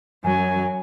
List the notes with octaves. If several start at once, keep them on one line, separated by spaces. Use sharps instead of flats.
F#2 F#3 G#5